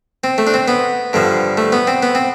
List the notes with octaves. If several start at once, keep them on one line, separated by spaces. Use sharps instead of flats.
C4
A3
D4
C4
B3
G2 D3 F3
A3
B3
C4
B3
C4